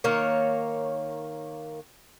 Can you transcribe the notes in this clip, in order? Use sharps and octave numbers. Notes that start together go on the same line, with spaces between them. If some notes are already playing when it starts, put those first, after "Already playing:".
D#3 A#3 C#5